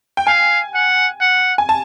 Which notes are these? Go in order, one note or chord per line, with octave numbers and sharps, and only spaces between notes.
G5
F5 G#5
F#5
F#5
G#5
A5